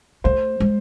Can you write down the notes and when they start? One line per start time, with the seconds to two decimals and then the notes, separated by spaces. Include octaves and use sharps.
0.24 A3 C5
0.60 G#3